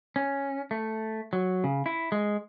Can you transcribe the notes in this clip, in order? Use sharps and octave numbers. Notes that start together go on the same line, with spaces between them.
C#4
A3
F#3
C#3
E4
G#3